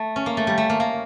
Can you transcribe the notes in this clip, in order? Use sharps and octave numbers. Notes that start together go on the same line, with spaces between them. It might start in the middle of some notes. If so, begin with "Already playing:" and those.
Already playing: A3
C#4
A#3
A3
G3
A3
A#3
A#3